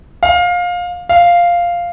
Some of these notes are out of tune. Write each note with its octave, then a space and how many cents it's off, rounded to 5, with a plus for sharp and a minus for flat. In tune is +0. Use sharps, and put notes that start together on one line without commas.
F5 +20
F5 -5